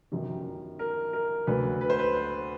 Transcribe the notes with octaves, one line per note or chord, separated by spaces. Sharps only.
G1 F#2 D#3 G3
A#4
A#4
D2 D3 F#3 A3 B4
B4
C5
B4
C5